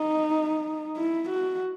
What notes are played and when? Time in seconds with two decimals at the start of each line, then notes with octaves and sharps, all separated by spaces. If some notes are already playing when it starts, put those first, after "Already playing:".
Already playing: D#4
0.97 E4
1.30 F#4